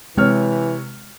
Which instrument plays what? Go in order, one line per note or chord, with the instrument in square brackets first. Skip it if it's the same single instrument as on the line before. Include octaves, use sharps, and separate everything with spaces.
[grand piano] C3 C#5 F6 [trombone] E3 [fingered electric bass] G#3